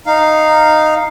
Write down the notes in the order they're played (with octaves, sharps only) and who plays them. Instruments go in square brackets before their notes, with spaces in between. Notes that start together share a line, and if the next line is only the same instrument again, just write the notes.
[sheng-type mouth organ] D#4 F5